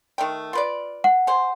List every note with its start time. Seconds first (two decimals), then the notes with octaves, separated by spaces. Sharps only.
0.18 D#3 A3 G5
0.53 F4 B4 D5
1.04 F#5
1.27 G#4 C5